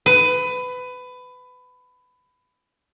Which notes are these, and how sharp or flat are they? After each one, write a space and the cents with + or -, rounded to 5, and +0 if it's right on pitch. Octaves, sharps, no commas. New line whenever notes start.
B4 +20